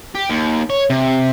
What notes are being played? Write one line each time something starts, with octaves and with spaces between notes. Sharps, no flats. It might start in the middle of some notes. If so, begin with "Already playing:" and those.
G4
D#2
C#5
C3